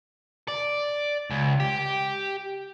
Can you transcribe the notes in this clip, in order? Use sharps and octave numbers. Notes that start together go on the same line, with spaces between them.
D5
C#2
G4